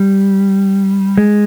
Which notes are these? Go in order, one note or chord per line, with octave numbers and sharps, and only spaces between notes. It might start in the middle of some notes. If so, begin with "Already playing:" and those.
Already playing: G3
G#3